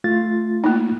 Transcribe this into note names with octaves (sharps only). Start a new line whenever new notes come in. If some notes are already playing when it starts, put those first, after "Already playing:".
A3 F4 A6
A#3 D#4